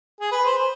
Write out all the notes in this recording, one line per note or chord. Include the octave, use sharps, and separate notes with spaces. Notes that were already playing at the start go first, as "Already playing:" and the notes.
G#4
B4
C5